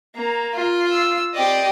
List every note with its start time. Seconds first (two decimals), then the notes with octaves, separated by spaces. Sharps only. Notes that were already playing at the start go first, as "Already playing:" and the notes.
0.15 A#3 A#5
0.55 F4
0.91 E6
1.35 C4 G4 D5 D#5